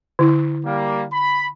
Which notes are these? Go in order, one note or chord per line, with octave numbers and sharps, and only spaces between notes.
D3 E4
G3 A#3
B5